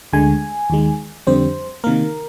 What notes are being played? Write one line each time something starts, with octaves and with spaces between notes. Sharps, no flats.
D2 D3 G#3 G#5
D#2 D#3 G#3
F2 D3 G3 C4 C5
C3 D#3 A#3 A#4